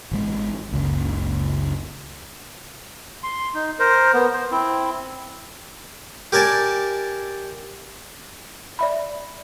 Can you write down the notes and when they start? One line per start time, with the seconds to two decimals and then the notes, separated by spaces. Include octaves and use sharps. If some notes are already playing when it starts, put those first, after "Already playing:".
0.11 G#1 E3 G#3
0.72 F#1 C#2
3.23 C6
3.54 D#4
3.79 A#4 C5
4.13 B3
4.33 C5
4.51 C4 E4
6.32 G4 A#4 D5 G#5 A5
8.79 D5 E5 B5